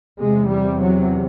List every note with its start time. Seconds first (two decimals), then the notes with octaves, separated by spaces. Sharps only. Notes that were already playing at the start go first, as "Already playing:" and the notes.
0.20 E2 C3 G#3
0.50 G3
0.80 F#3